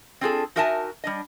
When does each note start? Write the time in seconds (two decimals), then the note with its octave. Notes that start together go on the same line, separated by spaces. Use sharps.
0.21 C4 D4 F4 F#4 G#4 A4
0.56 D#4 F#4 A#4 E5 G#5 A5
1.04 G3 D4 D#5